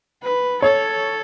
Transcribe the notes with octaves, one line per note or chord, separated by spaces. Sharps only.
B4
A4 C#5